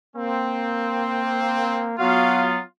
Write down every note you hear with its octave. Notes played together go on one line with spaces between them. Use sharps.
A#3 C4
F#3 B3 F4 F#4 F5